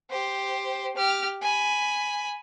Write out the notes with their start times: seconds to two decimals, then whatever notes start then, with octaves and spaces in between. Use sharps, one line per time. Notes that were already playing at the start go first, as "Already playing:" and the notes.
0.10 G4 C5
0.96 G4 F6
1.42 G#5 B5